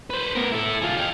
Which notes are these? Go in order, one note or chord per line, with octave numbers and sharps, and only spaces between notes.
B4 C5
B3 A#4
E4 A4
F4 G#4
F5 G5